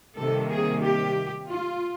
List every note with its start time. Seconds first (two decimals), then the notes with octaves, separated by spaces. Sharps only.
0.19 C3 D#3 G3 A#3 A4
0.51 G#4
0.84 G4
1.51 F4